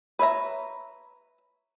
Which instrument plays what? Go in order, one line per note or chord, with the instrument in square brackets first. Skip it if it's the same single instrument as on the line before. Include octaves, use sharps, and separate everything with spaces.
[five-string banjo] B4 C#5 E5 A#5